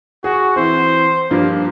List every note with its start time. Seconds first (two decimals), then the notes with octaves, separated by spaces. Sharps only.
0.24 F#4 G#4
0.56 E3 C4 E4 C5
1.31 G2 F3 A#3